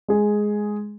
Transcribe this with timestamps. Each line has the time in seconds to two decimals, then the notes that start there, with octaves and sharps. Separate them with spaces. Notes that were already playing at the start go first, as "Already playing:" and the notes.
0.08 G#3 G#4